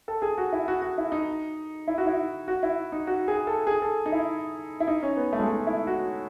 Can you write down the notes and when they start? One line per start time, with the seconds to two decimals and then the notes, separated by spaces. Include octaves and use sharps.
0.08 A4
0.22 G#4
0.38 F#4
0.52 E4
0.68 F#4
0.82 F#4
0.98 E4
1.12 D#4
1.88 E4
1.98 F#4
2.07 E4
2.48 F#4
2.63 E4
2.92 D#4
3.07 F#4
3.28 G#4
3.47 A4
3.67 G#4
3.82 A4
4.06 D#4
4.12 E4
4.80 E4
4.88 D#4
5.03 C#4
5.17 B3
5.33 A3
5.39 G#3
5.48 A3
5.67 E4
5.87 F#4